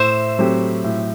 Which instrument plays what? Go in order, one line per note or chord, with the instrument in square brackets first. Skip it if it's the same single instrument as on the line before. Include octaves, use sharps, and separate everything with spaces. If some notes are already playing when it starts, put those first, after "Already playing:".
Already playing: [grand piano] A2 [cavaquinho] C5 E5
[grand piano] F#3 A3 C4 G4
A2